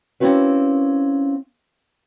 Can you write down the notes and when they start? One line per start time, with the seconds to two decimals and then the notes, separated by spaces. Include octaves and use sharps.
0.20 A#3 C4 C#4 E4 F#4 B4